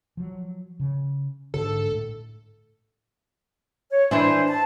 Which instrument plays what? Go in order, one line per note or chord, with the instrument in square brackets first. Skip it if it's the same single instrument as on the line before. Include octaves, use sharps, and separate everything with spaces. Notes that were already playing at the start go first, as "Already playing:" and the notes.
[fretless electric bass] F3 F#3
C#3
[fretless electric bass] G#2 D3 [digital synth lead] A4
[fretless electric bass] A2
[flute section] C#5
[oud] E3 D4 E4 [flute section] C5
[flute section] A5